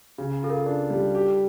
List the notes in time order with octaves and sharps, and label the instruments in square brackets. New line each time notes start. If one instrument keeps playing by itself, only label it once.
[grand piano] C#3
[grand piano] F4 [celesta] A4
[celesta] A#4
[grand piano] D4
G3
G4